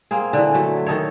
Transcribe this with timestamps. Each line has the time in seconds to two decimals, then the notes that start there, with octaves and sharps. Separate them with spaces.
0.11 A#3 C4 G#4
0.33 D3 E3
0.54 F#3 A3
0.86 D#3 D#4 A4 C#5